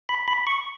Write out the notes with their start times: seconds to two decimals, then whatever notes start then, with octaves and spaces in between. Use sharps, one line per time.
0.09 B5
0.28 B5
0.47 C#6